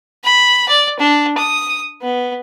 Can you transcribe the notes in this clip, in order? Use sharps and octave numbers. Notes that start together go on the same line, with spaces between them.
B5
D5
D4
D#6
B3